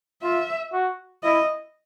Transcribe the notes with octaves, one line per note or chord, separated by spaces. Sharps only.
F4 E5
F#4
E4 D#5